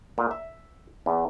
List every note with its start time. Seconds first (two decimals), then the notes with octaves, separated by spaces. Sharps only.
0.18 A#2
0.31 E5
1.06 E2